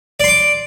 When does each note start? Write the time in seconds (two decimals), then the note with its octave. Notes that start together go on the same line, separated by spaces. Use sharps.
0.20 D5
0.24 C6
0.28 D6